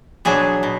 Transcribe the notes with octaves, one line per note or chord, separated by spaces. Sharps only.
B2 F#3 D4 G#4
B2